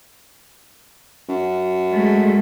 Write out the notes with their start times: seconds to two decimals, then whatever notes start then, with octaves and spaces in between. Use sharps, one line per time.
1.29 F#2
1.92 G#3 A3